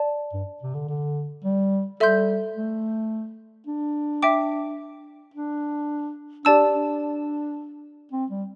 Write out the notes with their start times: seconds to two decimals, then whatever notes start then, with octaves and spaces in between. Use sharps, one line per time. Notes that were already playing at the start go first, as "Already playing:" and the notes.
Already playing: D5 A5
0.33 G2
0.62 C3
0.75 D3
0.89 D3
1.44 G3
2.00 G3 A4 E5 C6 G6
2.56 A3
3.67 D4
4.22 E5 G5 D6
5.34 D4
6.45 D4 G4 D5 A5 E6
6.73 D4
8.12 C4
8.30 G3